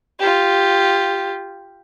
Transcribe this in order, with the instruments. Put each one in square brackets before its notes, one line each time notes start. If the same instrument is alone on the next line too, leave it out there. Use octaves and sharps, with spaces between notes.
[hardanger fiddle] F4 G4